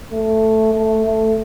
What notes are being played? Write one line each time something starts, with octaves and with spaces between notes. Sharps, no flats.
A3
A3
A3